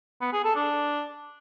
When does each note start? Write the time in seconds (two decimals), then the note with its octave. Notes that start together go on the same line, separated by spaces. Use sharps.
0.21 B3
0.33 G#4
0.44 A4
0.56 D4